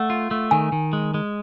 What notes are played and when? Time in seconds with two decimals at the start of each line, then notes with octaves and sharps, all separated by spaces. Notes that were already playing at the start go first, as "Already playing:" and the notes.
Already playing: A3 F#5
0.10 F4
0.31 A3
0.51 D#3 G#5
0.72 D#3
0.93 G#3
1.14 G#3